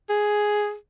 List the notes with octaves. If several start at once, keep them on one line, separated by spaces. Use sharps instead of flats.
G#4